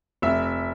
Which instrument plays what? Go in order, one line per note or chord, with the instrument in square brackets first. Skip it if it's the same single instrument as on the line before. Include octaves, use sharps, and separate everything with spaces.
[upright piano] F1 E5